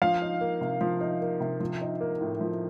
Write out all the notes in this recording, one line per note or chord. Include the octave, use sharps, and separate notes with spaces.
F3 F5
D#4
A#3
C3
F3
D#4
A#3
C3
F3
D#4
A#3
A2
F3